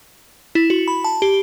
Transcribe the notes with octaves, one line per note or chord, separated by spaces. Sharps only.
E4
F#4
B5
A5
G4